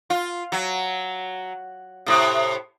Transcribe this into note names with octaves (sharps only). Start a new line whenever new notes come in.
F4
F#3
A2 C3